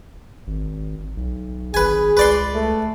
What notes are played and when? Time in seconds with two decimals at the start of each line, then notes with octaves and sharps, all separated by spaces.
0.47 G#1
1.17 B1
1.74 G#1 G#4 B4 G#5
2.17 C#2 B4 D5 C6
2.54 A3